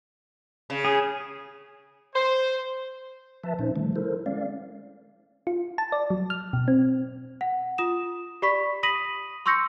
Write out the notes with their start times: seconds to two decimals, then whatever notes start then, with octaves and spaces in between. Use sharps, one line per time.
0.70 C#3
0.85 G#4
2.15 C5
3.44 F3 B4 E5 A5
3.59 A#2 C#4 D#4 C5
3.76 D3 D#3 F3 G3 A3
3.96 E4 A4 A#4 C5
4.26 G#3 C#4 D5 F5
5.47 F4
5.78 A5
5.92 D5
6.10 F#3
6.30 F6
6.53 B2
6.68 C4
7.41 F#5
7.78 F4 D#6 E7
8.42 G4 D5 B5 C#6 B6
8.83 B5 D#6 A#6 B6 D#7 F#7
9.46 C6 C#6 E6 G6 A#6 C#7